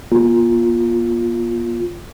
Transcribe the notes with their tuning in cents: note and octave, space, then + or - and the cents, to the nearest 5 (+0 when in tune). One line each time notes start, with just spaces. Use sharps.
A#3 +45 F4 +0